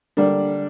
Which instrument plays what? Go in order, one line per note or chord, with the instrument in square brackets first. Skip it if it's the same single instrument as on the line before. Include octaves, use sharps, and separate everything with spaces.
[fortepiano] D3 G3 A#3 D4